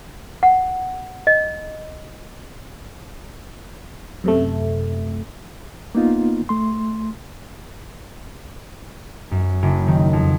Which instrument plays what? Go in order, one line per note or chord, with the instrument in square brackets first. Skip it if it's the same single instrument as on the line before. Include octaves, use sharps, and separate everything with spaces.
[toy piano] F#5
D#5
[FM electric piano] F#2 C3 A3
[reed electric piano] A#3 B3 D#4 F4
A3 C6
[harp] F#2
F#1
D#3
F2